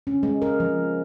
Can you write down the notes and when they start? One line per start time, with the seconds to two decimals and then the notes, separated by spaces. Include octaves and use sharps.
0.07 C#4
0.23 G#3
0.42 A#4
0.60 F3